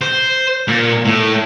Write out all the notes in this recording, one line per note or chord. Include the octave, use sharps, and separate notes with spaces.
C5
A#2
A2